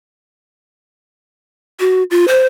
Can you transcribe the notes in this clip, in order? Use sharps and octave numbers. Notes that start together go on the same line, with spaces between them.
F#4
F4
C5